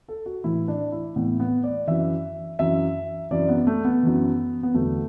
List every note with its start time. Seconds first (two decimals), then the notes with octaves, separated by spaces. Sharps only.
0.08 A4
0.26 F#4
0.44 A2 E3 E4
0.68 D4
0.92 E4
1.16 A2 E3 B3
1.40 B3
1.64 D5
1.87 F#2 E3 E5
2.59 F#2 E3 E5
3.31 F#2 E3 D5
3.49 B3
3.67 A3
3.85 B3
4.03 F#2 E3
4.63 B3
4.74 E2 D3 F#3 A3